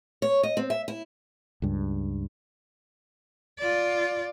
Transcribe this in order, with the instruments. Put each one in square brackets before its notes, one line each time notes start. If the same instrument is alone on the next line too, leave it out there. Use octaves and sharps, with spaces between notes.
[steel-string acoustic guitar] C#5
D#5
C4
E5
E4
[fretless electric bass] C#2 G2
[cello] F4 D5